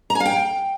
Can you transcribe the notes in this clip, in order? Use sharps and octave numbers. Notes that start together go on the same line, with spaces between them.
A#5
G#5
F5
G5